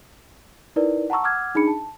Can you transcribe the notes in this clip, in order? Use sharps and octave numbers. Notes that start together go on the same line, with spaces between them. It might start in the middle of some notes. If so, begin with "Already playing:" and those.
D#4 E4 A#4 B4 D5
F#5 A5 A#5 C#6 E6
F#5 D6 E6 F6 G#6
D4 D#4 G#4 B5 C#7
A5